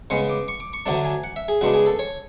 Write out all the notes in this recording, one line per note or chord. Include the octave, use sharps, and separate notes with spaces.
C#3 G#3 B3 C#6
D6
C#6
D6
C#6
D2 D3 F#3 A3 D4 A5
G#5
F#5
E5
G#4
C#3 G#3 B3 D4 F#4
G#4
A4
C#5